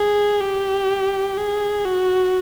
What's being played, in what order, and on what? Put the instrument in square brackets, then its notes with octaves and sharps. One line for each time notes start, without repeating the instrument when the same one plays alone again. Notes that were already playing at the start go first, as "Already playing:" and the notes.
Already playing: [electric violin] G#4
G4
G#4
F#4